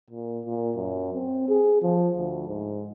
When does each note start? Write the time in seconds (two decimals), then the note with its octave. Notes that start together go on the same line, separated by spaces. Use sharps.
0.10 A#2
0.45 A#2
0.76 F#2
1.13 C4
1.49 G#4
1.82 F3
2.17 D2
2.47 G#2